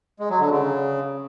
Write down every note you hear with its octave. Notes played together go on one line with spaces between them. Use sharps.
G#3
F#3
D3
C#3